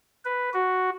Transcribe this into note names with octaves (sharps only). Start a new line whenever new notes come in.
B4
F#4